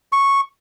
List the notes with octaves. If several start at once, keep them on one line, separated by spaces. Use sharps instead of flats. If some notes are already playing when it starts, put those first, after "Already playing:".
C#6